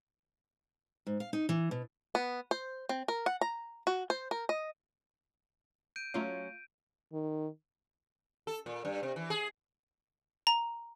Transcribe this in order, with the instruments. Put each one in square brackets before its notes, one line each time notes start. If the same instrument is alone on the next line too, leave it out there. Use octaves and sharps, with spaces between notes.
[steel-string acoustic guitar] G#2
F5
D#4
E3
B2
[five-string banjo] B3
C5
C4
A#4
F#5
A#5
F#4
C5
A#4
D#5
[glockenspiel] G6 D7 D#7
[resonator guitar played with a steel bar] F#3 C#4 [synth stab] A3 F4 F5
[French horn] D#3
[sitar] A4
A#2
G2
C3
E3
G#4
[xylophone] A#5